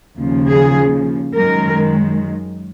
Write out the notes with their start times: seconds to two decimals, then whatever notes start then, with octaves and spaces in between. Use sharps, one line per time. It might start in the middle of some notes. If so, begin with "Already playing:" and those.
0.17 D#2 C#3 F3
0.47 G#4
1.35 F#2 D#3 G#3 A#4